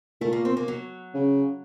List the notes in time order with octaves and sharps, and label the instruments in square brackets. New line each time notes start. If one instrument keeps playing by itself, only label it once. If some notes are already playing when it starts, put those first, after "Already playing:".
[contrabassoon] A#2 [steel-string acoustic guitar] A3
[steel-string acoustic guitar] A#3
C4
A#3
F#3
[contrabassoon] C#3